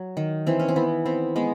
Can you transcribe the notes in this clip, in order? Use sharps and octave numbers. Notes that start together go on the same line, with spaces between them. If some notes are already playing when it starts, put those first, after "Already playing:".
Already playing: F#3
D#3
E3 C4
C#4
C4
E3 B3
B3 C4
G#3 B3